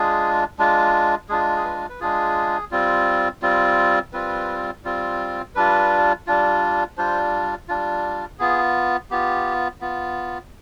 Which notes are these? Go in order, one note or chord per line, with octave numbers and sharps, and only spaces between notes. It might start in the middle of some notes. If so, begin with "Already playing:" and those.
Already playing: G#3 D4 F4 G#4
G#3 D4 F4
G#3 D4 F4 G#4
G#4
B4
B4
G#3 D4 F4 G#4
G3 C4 F4
G3 C4 F4
G3 C4 F4 B4
G3 C4 F4
G3 D4 F4 B4
G3 D4 F4
G3 D4 F4 C5
G3 D4 F4
B3 F4 G#4
B3 F4 G4
B3 F4